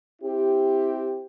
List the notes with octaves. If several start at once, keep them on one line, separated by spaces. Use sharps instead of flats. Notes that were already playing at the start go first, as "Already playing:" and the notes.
C4 E4 G4